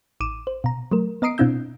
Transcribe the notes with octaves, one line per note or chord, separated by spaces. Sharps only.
A1 D6 D#7 E7
C5
B2 A#5
F#3 A3 A#4
B3 D#5 A#5 D#6 C7 D7
B2 C4 D4 E4 E6 G6